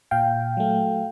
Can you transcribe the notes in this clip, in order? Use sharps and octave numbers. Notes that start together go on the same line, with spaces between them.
A#2 F5 G5
F#3 A3